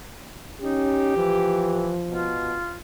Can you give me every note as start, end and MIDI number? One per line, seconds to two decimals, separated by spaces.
0.61 1.16 61
0.61 1.16 63
0.61 1.93 67
1.17 1.97 52
1.17 2.36 53
2.10 2.55 47
2.10 2.78 65